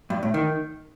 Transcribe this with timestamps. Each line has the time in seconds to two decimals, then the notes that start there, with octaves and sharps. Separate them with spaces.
0.10 G2
0.23 A2
0.34 D#3